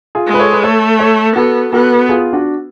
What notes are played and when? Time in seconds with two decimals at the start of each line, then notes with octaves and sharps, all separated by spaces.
0.15 F4 G#4
0.27 G#3
0.34 B4
0.39 A4 C#5
0.53 B4
0.63 A3 A4 C#5
0.99 A4 C#5
1.36 B3 F#4 A4
1.73 B3 F#4 A4
2.09 F4 G#4
2.33 D4 F#4